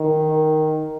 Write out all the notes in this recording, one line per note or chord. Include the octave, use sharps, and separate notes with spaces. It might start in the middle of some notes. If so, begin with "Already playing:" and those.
Already playing: D#3